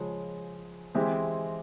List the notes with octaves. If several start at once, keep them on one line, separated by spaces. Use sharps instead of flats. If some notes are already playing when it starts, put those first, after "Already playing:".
Already playing: C#3 F3 G#3 C#4
E3 G#3 C4 E4 G4